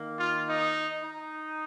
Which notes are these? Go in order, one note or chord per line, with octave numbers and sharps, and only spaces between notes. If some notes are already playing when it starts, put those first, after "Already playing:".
Already playing: D#3 A#3
F4
D#4
D#4